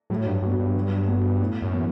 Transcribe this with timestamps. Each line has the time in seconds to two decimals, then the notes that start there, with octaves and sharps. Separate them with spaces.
0.10 A2 F#3
0.26 G2
0.42 G2 B3 F#4
0.59 G2
0.75 F#3
1.07 B3 F#4
1.41 A2
1.62 F#2
1.73 E3 B3